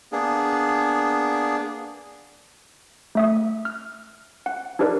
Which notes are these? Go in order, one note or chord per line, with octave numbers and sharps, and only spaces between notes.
A#3 B3 D4 G#4
A3 E5 D#6
F6
F#5
D4 D#4 G4 A#4 B4 D5